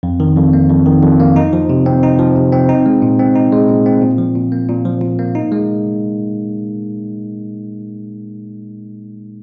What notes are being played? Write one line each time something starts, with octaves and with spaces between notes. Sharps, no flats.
F2
D#3
F2
A#3
F2
D#3
F2
A#3
D#4
F3
C3
C4
D#4
F3
C3
C4
D#4
G#3
A#2
C4
D#4
G#3
A#2
C4
A#2
F3
A#2
A#3
A#2
F3
A#2
A#3
D#4
G#3